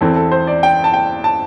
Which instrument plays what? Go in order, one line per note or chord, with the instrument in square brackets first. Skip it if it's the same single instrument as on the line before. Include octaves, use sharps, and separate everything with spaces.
[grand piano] E2 E3 C4 A4
A4
C5
D5
G5
A5
G5
A5